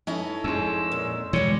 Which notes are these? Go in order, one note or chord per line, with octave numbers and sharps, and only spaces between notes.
C#4 D#4 E4 A4
F2 G#3 C#4 E6
A#2
E2 B2 D3 G3 G#3 C#5